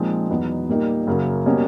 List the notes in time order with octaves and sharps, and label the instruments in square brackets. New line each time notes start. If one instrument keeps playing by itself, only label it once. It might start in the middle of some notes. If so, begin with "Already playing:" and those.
Already playing: [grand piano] A#2 F3 G#3 C4 D#4
E2 B2 F#3 B3 D#4
A#2 G3 A#3 D#4
F#2 C#3 F#3 A#3
B2 G3 A#3 C#4